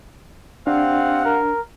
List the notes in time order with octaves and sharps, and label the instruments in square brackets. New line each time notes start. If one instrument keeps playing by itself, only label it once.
[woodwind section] C3 F5 F#5 [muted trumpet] C4 [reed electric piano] D4
[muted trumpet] A#4